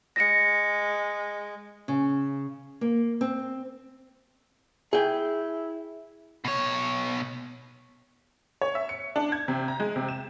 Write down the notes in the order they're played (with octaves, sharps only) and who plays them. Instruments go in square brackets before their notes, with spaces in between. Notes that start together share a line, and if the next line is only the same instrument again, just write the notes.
[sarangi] G#3 [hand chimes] A#6 C#7
[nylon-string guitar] C#3
A#3
C4
[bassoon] E4 [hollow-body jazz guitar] G#4 G5
[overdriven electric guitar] B2 C#5
[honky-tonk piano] C#5
E5
C#7
D4
G#6
C3
A#5
G#3
C3
E7